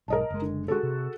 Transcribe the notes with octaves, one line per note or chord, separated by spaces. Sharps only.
B1 G#2 A#4 D#5 A5
F#1 G#3
D3
G#3 C4 D4 F#4 G#4 A4
C3